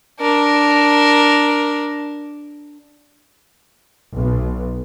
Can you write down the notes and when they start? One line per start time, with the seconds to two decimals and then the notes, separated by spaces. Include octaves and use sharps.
0.20 D4 A#4
4.17 B1